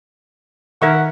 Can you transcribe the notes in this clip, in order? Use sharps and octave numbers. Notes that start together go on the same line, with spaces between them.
D#3 D#4 A#4 E5 F#5 C#6